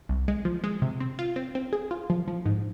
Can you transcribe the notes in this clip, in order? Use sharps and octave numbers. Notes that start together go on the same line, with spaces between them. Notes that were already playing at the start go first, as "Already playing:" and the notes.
C2
G#3
F3
G#3
C3
C4
F4
C4
C4
G#4
F4
F3
F3
G#2